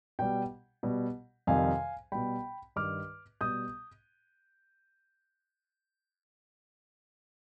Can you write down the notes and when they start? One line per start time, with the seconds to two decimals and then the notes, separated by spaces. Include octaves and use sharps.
0.19 B2 G3 G5
0.83 B2 G3
1.47 F2 C3 D#3 G3 F5 G#5
2.12 B2 G3 G5 B5
2.76 G2 D#3 G3 D6 F6
3.41 B2 G3 D#6 G6